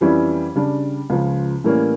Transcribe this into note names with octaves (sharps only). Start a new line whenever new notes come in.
F2 E3 G3 C#4 E4
C#3 G3 D4
C#2 C#3 F3
A2 E3 G3 A#3 C#4